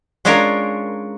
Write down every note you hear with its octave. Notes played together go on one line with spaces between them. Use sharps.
G#3 C#4 D4 F4 A#4